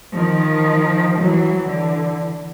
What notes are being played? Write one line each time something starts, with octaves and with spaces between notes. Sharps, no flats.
D#3 F3
E3 F#3
D3 E3